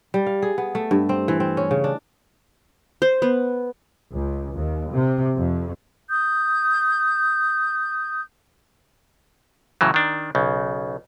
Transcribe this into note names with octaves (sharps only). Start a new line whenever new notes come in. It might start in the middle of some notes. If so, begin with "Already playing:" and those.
G3
F5
G#4
B3
A3
G2
C4
E3
C4
C#4
C#3
D4
C5
B3
C#2
D#2
C3
F2
D#6 G6
A2 C#3 E3 F#3
D#3 D4
B1 C#3